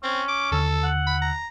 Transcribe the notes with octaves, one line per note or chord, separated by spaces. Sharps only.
C4 C#4
D6
D#2 D3 A4 E6
F#5
B5
A#5